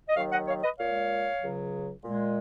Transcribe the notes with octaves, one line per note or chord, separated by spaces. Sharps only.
D#5
D#2 D#3 F#3 C#5 F5
D#5 F#5
C#5 F5
B4 D#5
A#2 G#3 C#5 F5
C#2 C#3 F#3
A#2 G#3